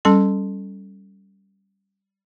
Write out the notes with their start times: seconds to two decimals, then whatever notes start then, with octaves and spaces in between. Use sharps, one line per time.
0.05 G3 C#4 A4 A5 C6